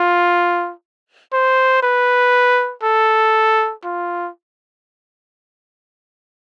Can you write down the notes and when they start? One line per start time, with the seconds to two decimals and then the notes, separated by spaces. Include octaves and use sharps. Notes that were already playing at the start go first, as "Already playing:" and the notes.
Already playing: F4
1.33 C5
1.83 B4
2.83 A4
3.84 F4